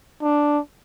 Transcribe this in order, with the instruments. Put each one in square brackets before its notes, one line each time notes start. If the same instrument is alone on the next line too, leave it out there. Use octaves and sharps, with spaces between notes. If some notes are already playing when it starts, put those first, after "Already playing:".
[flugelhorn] D4